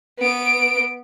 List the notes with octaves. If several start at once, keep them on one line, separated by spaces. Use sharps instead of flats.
B3 D7